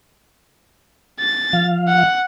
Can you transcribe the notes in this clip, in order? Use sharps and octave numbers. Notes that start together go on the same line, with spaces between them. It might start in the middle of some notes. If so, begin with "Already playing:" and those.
A6
F3 F5
F#5